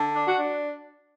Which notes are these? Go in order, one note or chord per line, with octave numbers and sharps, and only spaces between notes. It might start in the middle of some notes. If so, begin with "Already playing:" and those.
Already playing: D3
D4
F#4
D4